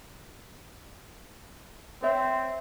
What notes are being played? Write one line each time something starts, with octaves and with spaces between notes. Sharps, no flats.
C4 C#5 E5